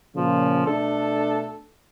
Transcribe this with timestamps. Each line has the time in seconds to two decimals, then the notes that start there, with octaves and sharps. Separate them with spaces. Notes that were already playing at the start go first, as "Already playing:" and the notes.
0.16 A#2 C#3 F3
0.66 B2 A3 D4 A4